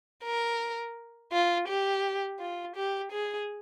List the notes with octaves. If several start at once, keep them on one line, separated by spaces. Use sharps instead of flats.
A#4
F4
G4
F4
G4
G#4